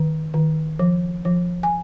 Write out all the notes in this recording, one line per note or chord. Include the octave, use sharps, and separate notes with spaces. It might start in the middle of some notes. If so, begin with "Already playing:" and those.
Already playing: D#3
D#3
F3
F3
G#5